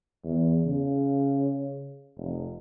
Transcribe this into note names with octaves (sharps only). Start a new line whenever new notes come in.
E2
C#3
F1